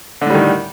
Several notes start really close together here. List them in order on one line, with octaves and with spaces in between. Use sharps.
D3 A2 G3 D#3